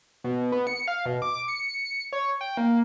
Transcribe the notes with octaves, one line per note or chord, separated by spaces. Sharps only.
B2
B3
C#7
F5
B2
D6
C#7
C#5
G5
A#3